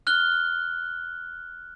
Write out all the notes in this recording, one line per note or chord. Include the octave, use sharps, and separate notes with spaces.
F6 F#6 G7